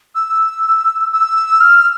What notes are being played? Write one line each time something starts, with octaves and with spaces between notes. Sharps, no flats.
E6
E6
F6